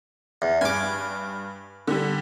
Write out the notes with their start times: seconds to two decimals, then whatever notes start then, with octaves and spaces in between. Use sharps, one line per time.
0.42 E2
0.61 G2 G#5 D6
1.87 D3 G3